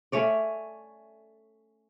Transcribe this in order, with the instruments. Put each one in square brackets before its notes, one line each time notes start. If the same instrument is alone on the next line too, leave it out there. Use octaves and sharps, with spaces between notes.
[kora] A3 C#4 C#5 D5